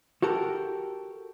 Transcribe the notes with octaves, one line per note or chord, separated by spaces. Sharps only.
F#4 G4 A4 A#4